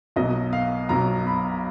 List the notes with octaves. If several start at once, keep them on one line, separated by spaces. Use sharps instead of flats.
B1 B2 F#3 D#5
F5
B1 B2 F#3 A#5
B5